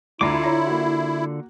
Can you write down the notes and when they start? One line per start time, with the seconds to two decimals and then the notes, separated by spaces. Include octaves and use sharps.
0.21 D2 D3 D4 E4 F4 A#5 D6
0.42 C#5 A#5 C6
0.66 A#3 F#4